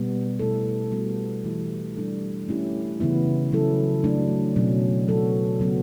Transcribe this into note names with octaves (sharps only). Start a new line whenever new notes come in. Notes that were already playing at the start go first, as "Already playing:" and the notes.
Already playing: B2 G3 B3
B2 A3 E4 A4
G3 B3 F#4
E3 A3 E4 G4
G3 D4 A4
A3 C#4 E4 G4
C#3 E3 B3 E4
C#3 F#3 C#4 E4 A4
F#3 A3 D4
B2 F#3 C#4
F#3 B3 F#4 A4
C#3 F#3 B3 F#4